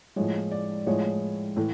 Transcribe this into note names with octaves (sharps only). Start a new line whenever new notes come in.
A2 F3 G#3 C#5
D5
A2 F3 G#3 C#5
A2 E3 A3